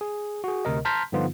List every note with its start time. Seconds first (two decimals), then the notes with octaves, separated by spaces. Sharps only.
0.01 G#4
0.44 F#4 G#4
0.65 D2 C3 A#4 D#5
0.85 A5 A#5 C6 F6 G6 B6
1.12 G2 D3 F3 B3 D#4 F4